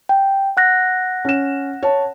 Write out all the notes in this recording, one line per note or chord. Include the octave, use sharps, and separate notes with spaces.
G5
F#5 F#6 A#6
C#4 E7
C#5 A5